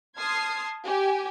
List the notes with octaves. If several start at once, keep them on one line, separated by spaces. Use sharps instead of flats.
A5 C6 D#6 F6 G#6 C7
G4 G#5